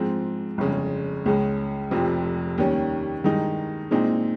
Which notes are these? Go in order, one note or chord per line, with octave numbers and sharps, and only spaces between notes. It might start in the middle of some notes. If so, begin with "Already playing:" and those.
Already playing: G#2 F3 G#3 C4
G1 F2 C#3 G#3
C#2 C#3 G#3
F1 F2 C3 F3 C4
D#2 D#3 G3 C#4
G2 D#3 G#3 D#4
A#2 G#3 C4 D#4